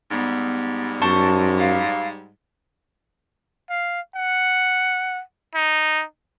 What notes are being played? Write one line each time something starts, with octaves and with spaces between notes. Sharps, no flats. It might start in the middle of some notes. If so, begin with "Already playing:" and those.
G#2 G3 B3
F#2 C5 A5 C#6
F5
F5
F#5
D#4